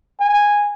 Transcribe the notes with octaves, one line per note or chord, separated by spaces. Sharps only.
G#5